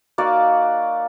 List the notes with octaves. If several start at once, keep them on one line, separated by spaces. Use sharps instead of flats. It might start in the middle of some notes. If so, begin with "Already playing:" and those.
A#3 D#4 F#4 D5